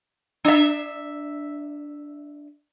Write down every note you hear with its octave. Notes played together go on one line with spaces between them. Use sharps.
D4 E5